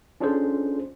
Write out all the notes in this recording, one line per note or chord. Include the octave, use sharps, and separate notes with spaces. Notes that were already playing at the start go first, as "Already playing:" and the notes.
C#4 D4 F4 G#4 A4 C5